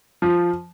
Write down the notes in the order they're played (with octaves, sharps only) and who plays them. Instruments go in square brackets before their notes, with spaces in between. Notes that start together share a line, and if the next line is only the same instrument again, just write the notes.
[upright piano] F3